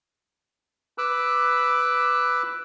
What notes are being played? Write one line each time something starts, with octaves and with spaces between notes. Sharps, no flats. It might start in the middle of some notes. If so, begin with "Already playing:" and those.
B4 B5 D6 E6 F#6